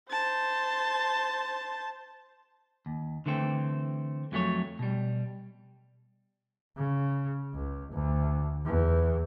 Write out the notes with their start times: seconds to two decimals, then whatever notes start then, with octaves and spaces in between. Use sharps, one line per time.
0.11 C5 A5
2.86 D#2
3.26 D3 E3 A3 C4
4.32 F2 F#3 A3 G4 C#5
4.79 B2 G3
6.77 C#3
7.54 C#2
7.92 D2
8.65 E2